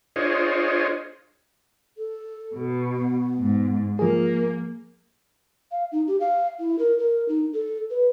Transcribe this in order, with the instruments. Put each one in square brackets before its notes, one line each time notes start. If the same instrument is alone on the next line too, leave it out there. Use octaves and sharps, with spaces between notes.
[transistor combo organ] D4 F4 G#4 C5 C#5 D#5
[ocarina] A4
[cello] B2
[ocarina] B3
[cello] G#2
[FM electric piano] F3 G#4 [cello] A#3 [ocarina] A#4
[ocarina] F5
D#4
G4
F5
E4
A#4
A#4
D#4
A4
B4